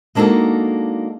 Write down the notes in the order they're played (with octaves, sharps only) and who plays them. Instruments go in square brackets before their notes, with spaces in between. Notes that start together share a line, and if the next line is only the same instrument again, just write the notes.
[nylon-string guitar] G#3 A#3 D4 D#4 F#4 A4